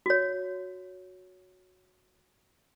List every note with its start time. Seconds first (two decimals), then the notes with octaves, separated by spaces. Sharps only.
0.06 F#4 C#5